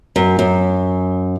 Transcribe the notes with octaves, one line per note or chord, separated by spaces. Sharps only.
F#2
F#2